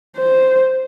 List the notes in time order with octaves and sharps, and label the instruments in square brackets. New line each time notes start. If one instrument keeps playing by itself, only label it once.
[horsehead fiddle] C5